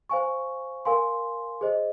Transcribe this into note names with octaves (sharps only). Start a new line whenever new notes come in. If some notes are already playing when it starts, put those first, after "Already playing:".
C5 F5 G#5 C#6
A#4 F5 G#5 C6
G#4 C5 D#5